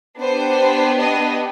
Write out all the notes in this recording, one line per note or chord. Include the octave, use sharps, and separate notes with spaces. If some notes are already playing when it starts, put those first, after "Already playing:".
B3 D4 G4 C5
D#5